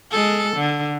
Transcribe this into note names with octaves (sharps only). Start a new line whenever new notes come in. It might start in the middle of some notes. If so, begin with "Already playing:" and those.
G#3 A4
D3